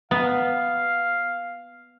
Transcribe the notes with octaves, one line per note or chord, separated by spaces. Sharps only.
B3 F5